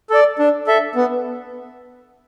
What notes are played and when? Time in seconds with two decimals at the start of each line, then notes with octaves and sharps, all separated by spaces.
0.10 A4 D5
0.39 D4
0.67 A4 E5
0.95 B3